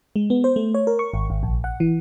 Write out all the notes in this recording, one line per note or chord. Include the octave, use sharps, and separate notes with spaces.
G#3
B3
C5
A3
C#5
A#4
C#6
G#1
G#1
A#1
F#5
E3